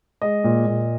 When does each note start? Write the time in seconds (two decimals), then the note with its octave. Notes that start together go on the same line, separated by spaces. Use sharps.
0.22 G#3 D#5
0.44 A#2
0.67 A#2